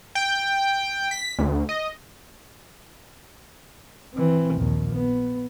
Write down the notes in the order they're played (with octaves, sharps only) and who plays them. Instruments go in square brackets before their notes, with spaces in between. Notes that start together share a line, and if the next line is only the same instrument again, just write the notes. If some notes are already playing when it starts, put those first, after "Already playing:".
[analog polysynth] G5
B6
D2
D#5
[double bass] E3 C4
A#1 D#2
B3